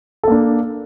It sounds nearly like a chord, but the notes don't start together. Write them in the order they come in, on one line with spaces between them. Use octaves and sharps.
A4 A#3 D4